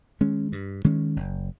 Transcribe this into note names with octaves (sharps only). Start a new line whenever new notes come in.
D#3 G#3 C#4
G2
D#3 G#3 C#4
F#1